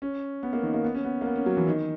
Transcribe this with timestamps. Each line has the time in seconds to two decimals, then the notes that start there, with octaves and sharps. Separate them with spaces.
0.02 C#4
0.43 B3
0.53 A#3
0.63 D#3
0.74 A#3
0.84 B3
0.95 C#4
1.04 B3
1.21 A#3
1.26 B3
1.36 C#4
1.46 F#3
1.57 E3
1.67 D#3